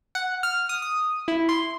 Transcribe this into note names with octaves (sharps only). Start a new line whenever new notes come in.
F#5
F6
D#6
D#6
E4
C6